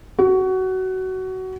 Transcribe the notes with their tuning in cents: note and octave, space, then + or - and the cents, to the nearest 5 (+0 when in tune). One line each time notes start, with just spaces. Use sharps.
F#4 +20